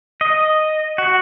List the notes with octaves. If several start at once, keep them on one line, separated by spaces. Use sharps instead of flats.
D#5
F#4